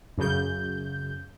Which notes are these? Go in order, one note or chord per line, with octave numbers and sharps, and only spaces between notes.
F#2 C#3 G6